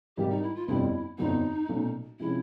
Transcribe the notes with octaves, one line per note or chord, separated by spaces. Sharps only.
G#1 G#2 D#3 G3 G4
D#4
E4
F4
G1 F2 D3 G3 E4
G1 F2 D3 F#3 B3 D#4
B1 A#2 F#3 A3 C#4
C3 F3 G#3 C#4 E4